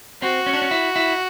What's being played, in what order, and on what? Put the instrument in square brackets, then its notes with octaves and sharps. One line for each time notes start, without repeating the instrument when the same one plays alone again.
[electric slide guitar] C4 [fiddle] F#4
[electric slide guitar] C#4
D4
C#4
E4
E4